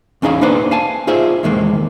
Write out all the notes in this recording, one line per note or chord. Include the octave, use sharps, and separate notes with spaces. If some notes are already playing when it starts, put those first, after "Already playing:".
E2 C#4 D#4 G#4 F5
A#3 D4 D#4 B4 C5 D5
F5 G#5 A5
D#4 F4 G#4 C5 E5
E2 D#3 G#3 A#3